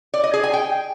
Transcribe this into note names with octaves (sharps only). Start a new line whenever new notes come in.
D5
D#5
G#4
G#5
G5